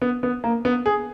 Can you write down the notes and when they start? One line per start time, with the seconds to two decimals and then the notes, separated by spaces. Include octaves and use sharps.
0.02 B3
0.23 B3
0.44 A#3
0.65 B3
0.86 G#4